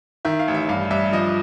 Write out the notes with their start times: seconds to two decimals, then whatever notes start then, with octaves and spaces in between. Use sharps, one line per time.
0.25 D#3 E5
0.39 F5
0.48 A1
0.55 E5
0.69 G2 F5
0.91 G2 E5
1.13 F3 D#5